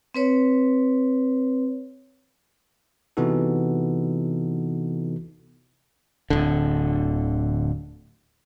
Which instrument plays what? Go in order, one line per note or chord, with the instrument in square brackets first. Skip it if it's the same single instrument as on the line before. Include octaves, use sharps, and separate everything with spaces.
[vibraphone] C4 B4 C#5
[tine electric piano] C3 E3 B3 D#4 F#4 A4
[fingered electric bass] D1 D3